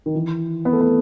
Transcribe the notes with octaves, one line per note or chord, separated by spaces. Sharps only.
D#3
E3
B3
A3
B3